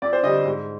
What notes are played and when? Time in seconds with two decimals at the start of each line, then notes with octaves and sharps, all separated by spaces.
0.02 F2 D5
0.13 C5
0.23 D3 G3 D#5
0.45 G#2